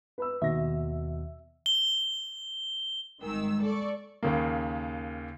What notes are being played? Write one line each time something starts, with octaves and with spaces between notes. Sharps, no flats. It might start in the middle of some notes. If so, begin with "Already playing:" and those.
B4 B5 E6
D#2 B2 E5 A#6
G7
G#1 D#3 G3 G#3 E6
A4 D5 C#6
D#2 C#3 A#3